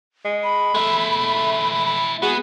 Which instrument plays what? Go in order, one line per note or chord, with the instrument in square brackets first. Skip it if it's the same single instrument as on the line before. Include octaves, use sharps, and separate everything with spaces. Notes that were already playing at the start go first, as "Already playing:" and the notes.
[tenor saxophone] G#3
[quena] B5
[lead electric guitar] G#3 E4 [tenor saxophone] A3
[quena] B5
[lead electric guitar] B3 [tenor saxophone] F#4 [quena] G#4